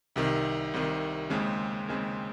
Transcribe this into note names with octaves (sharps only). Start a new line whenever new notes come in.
C2 C3 D#3
C2 C3 D#3
D#2 C#3 G#3 C4
D#2 C#3 G#3 C4